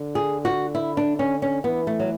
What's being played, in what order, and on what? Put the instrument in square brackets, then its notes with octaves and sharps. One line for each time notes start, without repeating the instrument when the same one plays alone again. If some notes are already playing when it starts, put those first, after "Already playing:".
Already playing: [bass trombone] D3
[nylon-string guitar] G#4
F#4
E4
D4
C#4
C#4
[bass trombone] E3 [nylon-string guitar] B3
[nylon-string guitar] A3
F#3